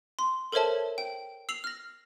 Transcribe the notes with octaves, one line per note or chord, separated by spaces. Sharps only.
C6
A4 A#4 C5 C#5 E5 A5
G5
E6 C7 F7 F#7
F6 A#6